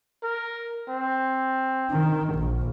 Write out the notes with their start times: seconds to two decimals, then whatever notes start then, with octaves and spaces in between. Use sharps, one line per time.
0.23 A#4
0.89 C4
1.91 D#3
2.34 A#1